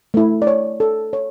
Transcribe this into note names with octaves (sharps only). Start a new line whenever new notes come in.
A3 E4
D5
C#5
A4
C#5